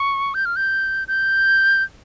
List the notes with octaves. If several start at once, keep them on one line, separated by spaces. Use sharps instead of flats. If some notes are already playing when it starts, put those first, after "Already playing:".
Already playing: C#6
G6
F6
G6
G6